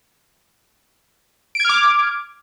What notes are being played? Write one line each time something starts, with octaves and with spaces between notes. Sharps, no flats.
D6 F6 G#6 D7